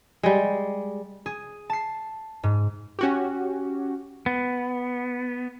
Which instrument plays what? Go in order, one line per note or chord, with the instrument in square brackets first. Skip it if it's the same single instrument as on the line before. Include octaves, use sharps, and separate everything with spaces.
[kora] G3 G#3
[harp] G#4
A5 C7
G#2
[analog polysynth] C#4 F#4 G4
[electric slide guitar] B3